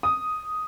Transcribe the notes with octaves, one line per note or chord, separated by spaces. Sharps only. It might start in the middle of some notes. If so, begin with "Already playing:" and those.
D#6